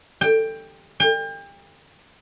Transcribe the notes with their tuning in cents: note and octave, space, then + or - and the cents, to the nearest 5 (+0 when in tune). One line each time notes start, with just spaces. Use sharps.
G5 +15
G5 +35